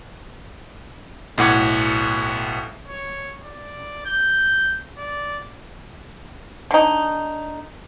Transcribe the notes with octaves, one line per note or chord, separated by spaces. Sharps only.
B1 A2 F#5 D6 G#6
C#5
D5
G6
D5
D3 D#4